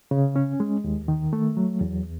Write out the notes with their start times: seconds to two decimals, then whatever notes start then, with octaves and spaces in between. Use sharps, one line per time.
0.11 C#3
0.36 C#4
0.60 G#3
0.84 D#2
1.08 D#3
1.33 A3
1.57 F#3
1.81 E2